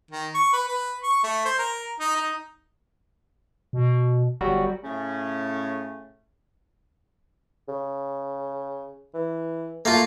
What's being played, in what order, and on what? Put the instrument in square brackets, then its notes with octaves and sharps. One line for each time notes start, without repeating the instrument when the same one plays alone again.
[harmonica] D#3
C#6
B4
B4
C#6
A3
C5
A#4
D#4
D#4
[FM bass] B2
[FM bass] G1 [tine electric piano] F#3 G3 F#4
[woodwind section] A2 C#3 A3 C#4
[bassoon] C#3
E3
[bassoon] A3 [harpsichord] A#3 F4